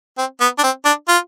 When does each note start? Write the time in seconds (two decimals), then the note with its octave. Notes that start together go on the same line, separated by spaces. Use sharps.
0.18 C4
0.41 B3
0.58 D4
0.63 C4
0.85 D4
1.08 F4